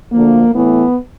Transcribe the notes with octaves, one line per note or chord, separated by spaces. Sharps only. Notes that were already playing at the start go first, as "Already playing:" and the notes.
D2 D3 F3 A#3
A2 E3 A3 B3